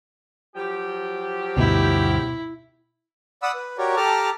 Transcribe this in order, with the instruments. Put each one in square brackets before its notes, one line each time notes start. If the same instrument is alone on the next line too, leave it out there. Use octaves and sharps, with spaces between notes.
[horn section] F3 F#3 G4
[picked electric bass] D2 G2 [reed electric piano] B2 [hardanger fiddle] E4
[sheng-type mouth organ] D5 F#5 B5 D#6 E6
B4
F#4 G4 A#4 C#5 D5
G4 A4 A5 A#5 D6 F6